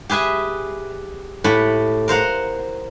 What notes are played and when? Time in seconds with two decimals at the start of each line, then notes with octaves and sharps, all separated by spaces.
0.10 G4 G#4 B4 E5 G#5
1.44 A2 G4 F#5 B5
2.08 A#4 C5 F5 F#5